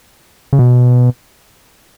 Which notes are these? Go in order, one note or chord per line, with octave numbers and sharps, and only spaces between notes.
C#3
B2